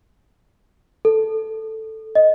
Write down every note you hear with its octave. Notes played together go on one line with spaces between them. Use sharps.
A4
D#5